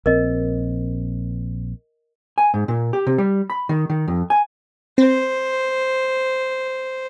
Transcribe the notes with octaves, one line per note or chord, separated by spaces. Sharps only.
A#1 C4 A#4 D#5
G#5
G#2
A#2
G4
C3
G3
B5
D#3
D#3
F2
G#5
C4 C5